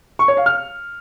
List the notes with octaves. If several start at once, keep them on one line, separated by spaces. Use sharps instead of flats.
C#6
C#5
F5
F6